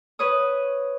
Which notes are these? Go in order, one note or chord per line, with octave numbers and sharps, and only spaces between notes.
B4 C#5 D#6